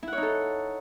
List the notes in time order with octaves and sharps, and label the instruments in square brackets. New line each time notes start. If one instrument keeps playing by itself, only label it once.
[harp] E4
F#5
C#5
D#4
A4